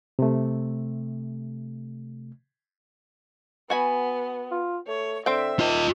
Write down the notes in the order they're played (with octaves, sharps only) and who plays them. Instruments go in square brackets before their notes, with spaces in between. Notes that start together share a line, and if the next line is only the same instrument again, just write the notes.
[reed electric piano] C3 A3
[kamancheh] B3 [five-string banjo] F#4 G#5 B5
[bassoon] F4
[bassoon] A3 [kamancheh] C#5
[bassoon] D3 [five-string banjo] C4 G5 [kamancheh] E5
[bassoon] D#3 [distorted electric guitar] F4 D#5